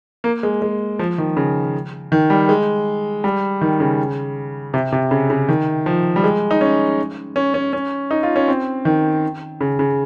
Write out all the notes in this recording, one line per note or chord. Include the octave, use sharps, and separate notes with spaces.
A#3
G#3
G#3
F3
D#3
C#3
D#3
G3
G#3
G3
D#3
C#3
C3
C3
C#3
C#3
D#3
F3
G3
G#3
D#4
C#4
C#4
C#4
C#4
D#4
F4
C#4
C4
D#3
C#3
C#3